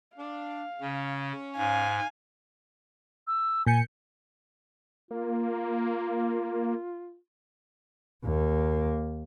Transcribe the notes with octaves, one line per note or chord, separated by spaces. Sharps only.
D4 F5
C#3 C#4
G#2 F5 G#5
E6
A#2 G#5 G6 C#7
A#3 F4
D#2 A#3